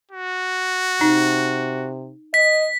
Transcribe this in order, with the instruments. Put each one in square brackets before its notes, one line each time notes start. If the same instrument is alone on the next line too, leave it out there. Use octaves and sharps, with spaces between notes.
[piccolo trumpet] F#4
[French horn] C3 [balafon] D#4
[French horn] D#5 [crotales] B6